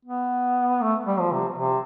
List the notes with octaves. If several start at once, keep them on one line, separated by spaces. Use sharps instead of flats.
B3
A3
G3
F3
C3
C3